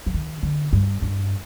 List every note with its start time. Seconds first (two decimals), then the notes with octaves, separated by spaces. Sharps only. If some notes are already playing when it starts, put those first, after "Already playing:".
0.06 F3
0.14 D#3
0.43 D3
0.73 G2
1.02 G2